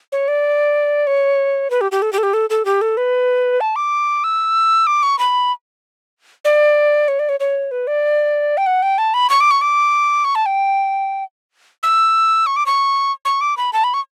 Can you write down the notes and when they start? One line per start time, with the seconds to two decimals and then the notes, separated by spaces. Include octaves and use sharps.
0.12 C#5
0.28 D5
1.07 C#5
1.70 B4
1.81 G4
1.92 G4
2.02 A4
2.13 G4
2.18 A4
2.23 G4
2.34 A4
2.50 A4
2.65 G4
2.81 A4
2.97 B4
3.61 A5
3.76 D6
4.24 E6
4.87 D6
5.03 C#6
5.19 B5
6.45 D5
7.08 C#5
7.19 D5
7.29 C#5
7.40 C#5
7.71 B4
7.87 D5
8.57 G5
8.66 F#5
8.82 G5
8.98 A5
9.14 B5
9.30 C#6
9.40 D6
9.51 C#6
9.61 D6
10.25 C#6
10.35 A5
10.46 G5
11.83 E6
12.46 C#6
12.56 D6
12.66 C#6
13.25 C#6
13.41 D6
13.57 B5
13.73 A5
13.84 B5
13.94 C#6